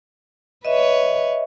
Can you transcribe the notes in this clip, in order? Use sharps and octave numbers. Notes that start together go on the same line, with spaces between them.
B4 C#5 D#5 E5